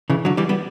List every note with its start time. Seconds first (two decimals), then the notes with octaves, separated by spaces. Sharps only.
0.10 C#3 E3
0.25 D3 F#3
0.37 E3 G3
0.49 G3 B3